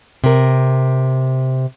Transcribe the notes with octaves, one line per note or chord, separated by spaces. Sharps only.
C3 A#4